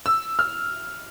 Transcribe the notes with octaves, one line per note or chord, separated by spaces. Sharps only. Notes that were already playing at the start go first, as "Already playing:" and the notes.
E6
F6